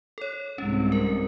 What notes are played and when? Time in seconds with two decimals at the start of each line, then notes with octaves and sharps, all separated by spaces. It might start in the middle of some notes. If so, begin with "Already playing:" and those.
0.18 A4 C#5
0.58 C2 G#2 C#4
0.92 A#4